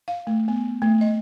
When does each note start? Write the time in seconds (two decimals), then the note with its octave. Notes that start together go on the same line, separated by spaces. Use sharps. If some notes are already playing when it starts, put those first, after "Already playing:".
0.08 F5
0.27 A3
0.48 B3
0.82 A3
1.01 D#5